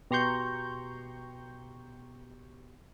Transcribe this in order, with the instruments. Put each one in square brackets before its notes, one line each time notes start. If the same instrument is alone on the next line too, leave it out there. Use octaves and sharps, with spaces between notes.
[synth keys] B2 G4 A#5 C6 C#6 G6